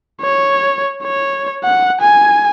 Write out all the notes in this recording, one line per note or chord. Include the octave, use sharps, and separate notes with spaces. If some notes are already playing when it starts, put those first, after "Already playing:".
C#5
C#5
F#5
G#5